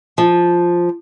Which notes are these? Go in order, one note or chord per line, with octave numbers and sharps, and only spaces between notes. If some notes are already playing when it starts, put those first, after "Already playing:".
F3